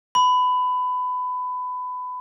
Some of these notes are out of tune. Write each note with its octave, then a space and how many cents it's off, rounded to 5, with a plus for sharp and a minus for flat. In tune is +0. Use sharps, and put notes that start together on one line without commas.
B5 +20